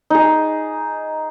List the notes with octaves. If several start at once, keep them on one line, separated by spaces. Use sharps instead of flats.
D#4 G#4